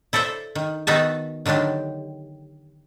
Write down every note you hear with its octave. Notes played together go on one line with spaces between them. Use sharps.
E4 A4 C5 D5 E5
D#3
D#3 B3 D#4 F#4 E5 A5
D3 D#3 F#3 D4 G4